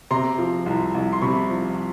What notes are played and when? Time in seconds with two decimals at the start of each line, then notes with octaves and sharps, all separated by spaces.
0.11 C3 A#5 C6
0.38 F3
0.66 C2
0.95 C2
1.13 C6
1.21 C3 B5 C#6
1.49 F3